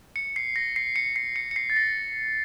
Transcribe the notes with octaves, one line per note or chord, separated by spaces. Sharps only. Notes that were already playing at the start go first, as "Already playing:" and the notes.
C#7
C7
A#6
C7
C#7
C7
C#7
C#7
C7
A6
A#6